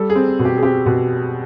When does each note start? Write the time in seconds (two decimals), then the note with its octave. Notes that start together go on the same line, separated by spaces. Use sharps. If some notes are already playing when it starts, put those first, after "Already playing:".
Already playing: G3 A4
0.10 G#4
0.15 C4
0.39 B2
0.45 G4
0.58 G#4
0.62 C4 G4
0.86 B2